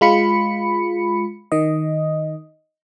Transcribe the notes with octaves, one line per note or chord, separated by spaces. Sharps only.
G#3 F4 B5 C#7
D#3 D#5